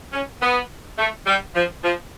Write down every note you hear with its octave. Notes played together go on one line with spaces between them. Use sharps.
C#4
B3
A3
G3
F3
F3